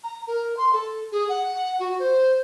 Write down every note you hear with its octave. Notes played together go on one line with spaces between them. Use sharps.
A#5
A#4
C6
A4
G#4
F#5
F#4
C5